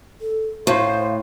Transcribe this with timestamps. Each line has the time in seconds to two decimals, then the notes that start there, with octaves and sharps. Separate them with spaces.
0.21 A4
0.67 A2 C5 F5